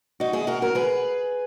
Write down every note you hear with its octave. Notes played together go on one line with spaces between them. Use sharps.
D#4 F#4
E4 G#4
F#4 A#4
F#4 A#4
G#4 B4